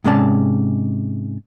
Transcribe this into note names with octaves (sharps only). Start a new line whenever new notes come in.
G#2 C3 G#3 C#4 D5 A5